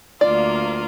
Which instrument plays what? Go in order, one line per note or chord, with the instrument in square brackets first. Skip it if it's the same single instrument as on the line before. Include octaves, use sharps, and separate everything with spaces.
[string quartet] D2 A#3 F4 [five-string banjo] D5